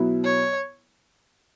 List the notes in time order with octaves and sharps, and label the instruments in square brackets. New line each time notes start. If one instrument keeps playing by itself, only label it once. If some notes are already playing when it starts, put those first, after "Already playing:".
Already playing: [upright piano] B2 F#3 B3 E4
[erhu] C#5